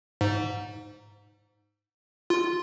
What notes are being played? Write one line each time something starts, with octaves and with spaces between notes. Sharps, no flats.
G#2
F4